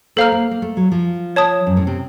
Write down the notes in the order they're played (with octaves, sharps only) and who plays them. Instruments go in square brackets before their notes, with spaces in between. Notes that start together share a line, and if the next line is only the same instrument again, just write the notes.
[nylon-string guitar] A#3 [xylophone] A4 C5 F5 A#5 F6
[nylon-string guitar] A#3
A#3
A3
F#3
F3
[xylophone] C#5 A5 D#6
[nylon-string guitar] F#2
A2
C3